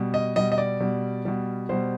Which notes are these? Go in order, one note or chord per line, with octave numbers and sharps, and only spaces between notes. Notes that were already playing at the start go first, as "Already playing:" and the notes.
Already playing: B2 G3
D#5
B2 G3 D#5
D#5
D5
B2 G3
B2 G3
B2 G3 C5